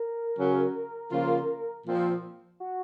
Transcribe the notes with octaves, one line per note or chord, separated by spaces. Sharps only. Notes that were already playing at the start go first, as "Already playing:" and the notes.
Already playing: A#4
C#3 F#3 C#4
C#3 F3 A#3 F4
A#2 F3 C4
F#4